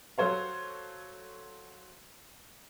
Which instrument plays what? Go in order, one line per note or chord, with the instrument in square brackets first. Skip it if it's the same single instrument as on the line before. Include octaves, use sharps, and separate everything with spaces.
[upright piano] F#3 A4 C5 C#5 F5